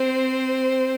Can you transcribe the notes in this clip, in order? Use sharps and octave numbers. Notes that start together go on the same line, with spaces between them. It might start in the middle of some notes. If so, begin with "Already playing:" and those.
Already playing: C4 C5